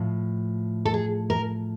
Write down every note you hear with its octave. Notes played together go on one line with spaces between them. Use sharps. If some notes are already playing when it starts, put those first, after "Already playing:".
Already playing: A2 F3
A4
G#4
A#4